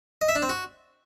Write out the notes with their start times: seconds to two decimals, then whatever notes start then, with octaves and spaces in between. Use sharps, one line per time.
0.21 D#5
0.28 E5
0.35 D4
0.42 C4
0.49 F#4